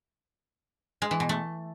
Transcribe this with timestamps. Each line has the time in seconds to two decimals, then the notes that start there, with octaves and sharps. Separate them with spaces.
1.02 G#3
1.11 E3
1.20 B2
1.29 A3